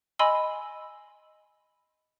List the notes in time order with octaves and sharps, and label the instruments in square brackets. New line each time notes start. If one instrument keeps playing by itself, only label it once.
[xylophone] D#5 G#5 B5 C6 E6